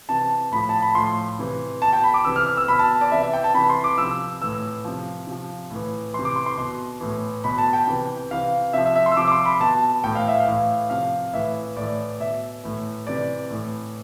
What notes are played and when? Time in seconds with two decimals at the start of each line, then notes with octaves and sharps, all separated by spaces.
0.09 C3 E3 A5
0.51 A2 F3 B5
0.69 A5
0.82 B5
0.95 A2 F3 C6
1.39 C3 E3
1.81 B2 A5
1.93 G5
2.04 B5
2.14 D6
2.25 C3 E3 E6
2.36 F6
2.47 F6
2.57 E6
2.68 B2 B5
2.79 A5
3.01 D5
3.11 C3 E3 E5
3.22 E5
3.33 G5
3.44 A5
3.54 C3 E3 B5
3.70 C6
3.84 D6
3.97 C3 F3 E6
4.41 A2 E3 E6
4.85 C3 F3
5.27 C3 F3
5.71 A2 E3
6.14 E3 C6
6.19 C3
6.25 D6
6.36 C6
6.46 C6
6.58 B2
7.00 A2 E3
7.44 B2 B5
7.58 A5
7.73 G5
7.87 C3 E3
8.31 C3 E3 F5
8.73 C3 F3 E5
8.85 E5
8.96 E5
9.06 C6
9.12 E6
9.17 C3 F3 D6
9.28 D6
9.32 C6
9.46 B5
9.60 B2 A5
10.04 A2 E3 G5
10.15 F5
10.28 E5
10.40 F5
10.47 A2 E3
10.90 C3 F3 F5
11.33 A2 E3 E5
11.76 A2 E3 D5
12.20 B2 E5
12.63 A2 E3
13.06 C3 E3 D5
13.50 A2 E3